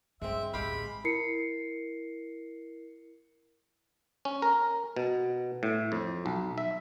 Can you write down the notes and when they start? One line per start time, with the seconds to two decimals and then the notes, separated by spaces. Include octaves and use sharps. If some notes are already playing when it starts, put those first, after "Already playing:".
0.22 G2 G#3 C4 E5
0.53 A1 D2 G#3 G4 F5 B5
1.04 E4 A#4 C7 C#7
4.25 C#4
4.42 A#4
4.96 B2
5.63 A2
5.92 F2
6.26 B1
6.58 E5